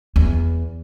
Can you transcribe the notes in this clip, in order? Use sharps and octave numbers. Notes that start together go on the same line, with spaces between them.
E2